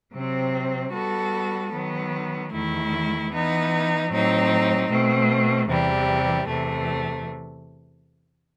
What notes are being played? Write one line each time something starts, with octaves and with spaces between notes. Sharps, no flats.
C3 F#3 C4
G3 B3 F#4 A4
D#3 F#3 B3
E2 D#3 A3 E4
E3 B3 D#4
A2 F#3 C4 D#4
B2 A3 C4
E2 C3 E3 G3
E2 C3 E3 A3